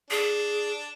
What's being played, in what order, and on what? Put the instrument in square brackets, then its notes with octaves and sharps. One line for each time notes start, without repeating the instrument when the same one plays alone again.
[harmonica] D4 [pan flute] G#4